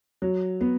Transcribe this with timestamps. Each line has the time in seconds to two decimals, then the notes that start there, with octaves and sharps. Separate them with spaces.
0.22 F#3
0.61 B3